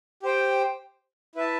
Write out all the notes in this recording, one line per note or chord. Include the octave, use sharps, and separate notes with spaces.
G4 C5 G5
E4 B4 E5 A5